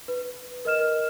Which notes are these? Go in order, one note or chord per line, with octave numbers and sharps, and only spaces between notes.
B4
A#4 D#5 F6 E7